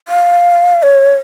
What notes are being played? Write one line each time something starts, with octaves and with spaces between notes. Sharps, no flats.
F5
C#5